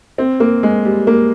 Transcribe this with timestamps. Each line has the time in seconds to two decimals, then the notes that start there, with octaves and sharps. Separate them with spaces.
0.18 C4
0.40 A#3
0.63 G#3
0.85 G3
1.07 A#3